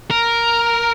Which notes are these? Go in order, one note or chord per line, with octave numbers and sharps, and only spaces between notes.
A#4